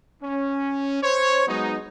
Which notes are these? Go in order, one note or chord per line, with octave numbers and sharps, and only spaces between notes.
C#4
C5 C#5
F#3 G#3 B3 D#4